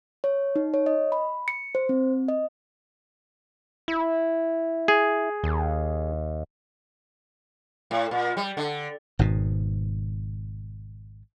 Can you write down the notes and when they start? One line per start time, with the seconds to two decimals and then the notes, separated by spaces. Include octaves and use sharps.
0.24 C#5
0.56 D#4
0.74 C#5
0.86 D#5
1.12 B5
1.48 C#7
1.75 C5
1.89 C4
2.28 D#5
3.88 E4
4.88 G#4
5.44 D#2
7.91 A2
8.11 A#2
8.37 G3
8.57 D3
9.19 G#1 G#2 B2